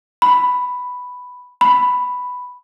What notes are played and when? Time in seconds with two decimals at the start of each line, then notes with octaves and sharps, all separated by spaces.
0.22 B5
1.61 B5